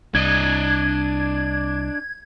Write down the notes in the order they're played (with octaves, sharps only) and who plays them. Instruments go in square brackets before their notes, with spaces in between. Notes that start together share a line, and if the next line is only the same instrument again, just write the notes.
[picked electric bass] C2 [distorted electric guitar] D4 D#5 [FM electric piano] G#6